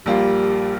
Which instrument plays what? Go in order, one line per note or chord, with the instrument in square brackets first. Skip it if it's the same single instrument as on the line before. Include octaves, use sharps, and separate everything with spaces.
[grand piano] A#1 A#2 G3 A#3 F4 [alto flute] G4